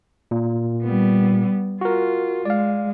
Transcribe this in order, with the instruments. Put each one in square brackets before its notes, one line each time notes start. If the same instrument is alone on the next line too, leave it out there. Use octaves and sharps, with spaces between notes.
[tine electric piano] A#2
[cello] G3 B3
[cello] F4 [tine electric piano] F#4 A#4
[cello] G#3 [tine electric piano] D5 F5